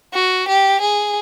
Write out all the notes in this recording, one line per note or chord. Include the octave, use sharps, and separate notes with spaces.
F#4
G4
G#4